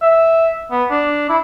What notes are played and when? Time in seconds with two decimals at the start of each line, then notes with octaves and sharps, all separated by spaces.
0.02 E5
0.71 B3
0.91 D4
1.30 E4